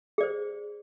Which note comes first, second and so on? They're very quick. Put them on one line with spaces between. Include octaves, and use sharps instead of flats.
G#4 D5 C5